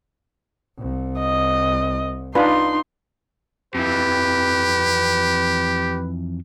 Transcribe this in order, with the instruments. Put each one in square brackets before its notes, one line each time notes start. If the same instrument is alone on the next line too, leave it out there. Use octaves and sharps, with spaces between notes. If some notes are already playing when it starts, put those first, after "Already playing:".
[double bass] C2
[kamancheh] D#5
[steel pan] D4 F4 B4 [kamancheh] D#4 C6
[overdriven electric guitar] F2 E3 [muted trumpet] G4 [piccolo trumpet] B4